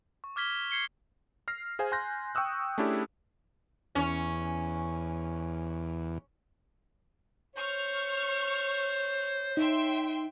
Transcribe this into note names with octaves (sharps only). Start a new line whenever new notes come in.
C#6
D6 F6 G#6 B6 G7
G#6 C7 C#7 G7
F6 A#6 C7
G#4 C5 F5 G#5
G#5 C6 F#6 G6 A#6
G5 C#6 D#6 E6 F#6
A3 C#4 D4 E4 G4 G#4
E2 C#4
C5 C#5 C#6 F6
D#4 E5 G5 C6